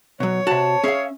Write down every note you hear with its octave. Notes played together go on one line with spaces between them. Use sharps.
B2 F#3 C#5
C3 F#4 A5
C#4 G#4 E5 F5